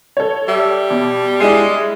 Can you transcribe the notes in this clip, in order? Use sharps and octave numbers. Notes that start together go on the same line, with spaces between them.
A4 C#5
G3 E5
B2 D5
G#3 D4 E4 C7